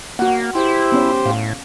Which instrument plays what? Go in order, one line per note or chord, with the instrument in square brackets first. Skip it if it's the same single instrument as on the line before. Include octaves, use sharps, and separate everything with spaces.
[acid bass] A#3 [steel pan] F#4 F#5
[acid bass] E4 [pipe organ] G4 C5
[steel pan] B3 C#4 C#5
[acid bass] A2 [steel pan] F5